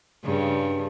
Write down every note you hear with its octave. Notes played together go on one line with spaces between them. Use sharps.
G2 C#3